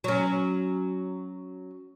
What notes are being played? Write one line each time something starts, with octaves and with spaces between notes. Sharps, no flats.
F#3 C#4